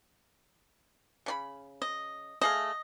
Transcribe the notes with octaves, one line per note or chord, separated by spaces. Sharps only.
C#3 D4 B5
D#5
A3 G#4 D#5 F5